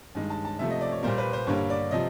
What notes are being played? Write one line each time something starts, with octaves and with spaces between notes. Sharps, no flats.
G2 D#3 G#3
A5
A5
C3 F3 A3 E5
D#5
D5
C#5
A#2 G3 A#3 C5
B4
C5
G2 D3 G3 A#3 C#5
D5
C3 F3 D#5